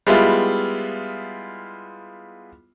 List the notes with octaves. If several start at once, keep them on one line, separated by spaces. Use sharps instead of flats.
G3 G#3 B3 E4 F4